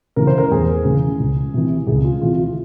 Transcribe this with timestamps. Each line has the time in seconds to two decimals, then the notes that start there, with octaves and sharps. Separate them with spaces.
0.16 C#3 E3 A#4
0.27 C5
0.38 A#4
0.51 E2 G#4
0.85 C#3 E3
1.20 C#2
1.54 C3 E3
1.87 C#2 G#4
2.05 F4
2.21 C3 E3 F4
2.39 F4